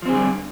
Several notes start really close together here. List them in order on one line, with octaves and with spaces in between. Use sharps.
F3 C4 G#4 D3 G3